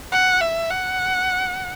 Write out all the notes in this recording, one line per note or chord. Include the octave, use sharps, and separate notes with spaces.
F#5
E5
F#5